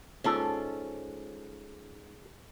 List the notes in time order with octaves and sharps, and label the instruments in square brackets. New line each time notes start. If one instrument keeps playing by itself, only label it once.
[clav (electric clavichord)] G#2 A4 A5 [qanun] C#4 F4 D5